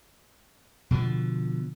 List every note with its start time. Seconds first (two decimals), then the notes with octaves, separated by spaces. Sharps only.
0.91 B2 D3 E3 F3